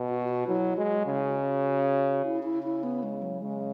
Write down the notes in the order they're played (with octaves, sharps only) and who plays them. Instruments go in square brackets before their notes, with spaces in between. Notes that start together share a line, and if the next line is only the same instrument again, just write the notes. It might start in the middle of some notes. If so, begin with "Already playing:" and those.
Already playing: [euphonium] B2
[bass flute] F#4
F#4
[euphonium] F#3 [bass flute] E4
[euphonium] G#3 [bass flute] F#4
[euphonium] C#3
[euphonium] C#3 [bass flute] E4
[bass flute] E4
E4
B3
G#3
F#3
[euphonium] C#3 [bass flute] G#3